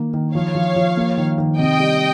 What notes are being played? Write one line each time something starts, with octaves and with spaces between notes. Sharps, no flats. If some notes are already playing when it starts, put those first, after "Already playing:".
Already playing: D#3 A#3
D#3
F3 C#5 F5
F3
F3
A#3
D#3
D#3
C3 D#5 G5
G3